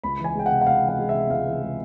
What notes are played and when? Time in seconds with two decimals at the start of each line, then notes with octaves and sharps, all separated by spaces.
0.04 C#2 B5
0.19 E3
0.24 G#5
0.35 G#3 G5
0.46 F#5
0.51 C3
0.61 F#5
0.67 C#2 F5
0.83 E3
0.89 F#5
0.99 G#3
1.09 E5
1.14 C3
1.30 C#2 F5
1.46 E3
1.63 G#3